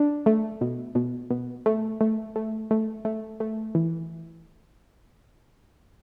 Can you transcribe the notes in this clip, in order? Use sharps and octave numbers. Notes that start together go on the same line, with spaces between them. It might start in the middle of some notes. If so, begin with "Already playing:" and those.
Already playing: D4
A3
B2
B2
B2
A3
A3
A3
A3
A3
A3
E3